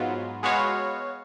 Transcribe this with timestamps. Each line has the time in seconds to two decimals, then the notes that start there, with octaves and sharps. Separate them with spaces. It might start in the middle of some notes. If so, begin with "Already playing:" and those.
Already playing: G#2 F#3 B3 F4
0.43 G#3 B3 F#4 C#5 F5